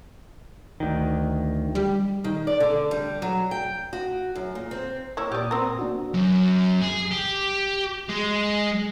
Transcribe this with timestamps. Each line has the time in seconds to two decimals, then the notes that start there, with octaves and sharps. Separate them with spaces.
0.80 D2 D#3
1.75 G3
2.24 D#3
2.47 D5
2.60 D3
2.91 G3
3.22 F#3
3.51 G5
3.93 F#4
4.36 F#2
4.55 A#2
4.71 C4
5.17 A#3 E4 C#5
5.32 A#2 G4 D5 D#6
5.51 C4 A#4
5.79 A#3 D4 F#4
6.14 F#2
6.82 G#4
7.11 G4
8.09 G#3